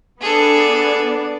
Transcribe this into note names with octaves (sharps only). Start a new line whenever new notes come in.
B3 D4 G#4 A4